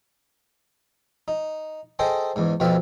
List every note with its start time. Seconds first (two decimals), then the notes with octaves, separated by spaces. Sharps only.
1.28 D#4
1.99 G#4 A4 C5 D#5 G5
2.36 E2 G#2
2.60 F2 B2 C4 E5 F5